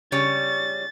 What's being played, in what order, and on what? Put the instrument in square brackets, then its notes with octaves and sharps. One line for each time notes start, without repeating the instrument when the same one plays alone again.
[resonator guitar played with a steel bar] C#3 G3 C#5 [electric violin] A6